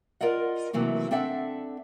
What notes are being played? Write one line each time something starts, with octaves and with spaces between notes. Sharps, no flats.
F4 A#4 D5 D#5 F#5
C3 E3 F#3 A3 A#3
C4 D4 A4 E5 F#5